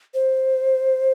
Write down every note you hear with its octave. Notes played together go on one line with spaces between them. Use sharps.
C5